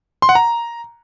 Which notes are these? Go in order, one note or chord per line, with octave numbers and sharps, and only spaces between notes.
C6
F#5
A#5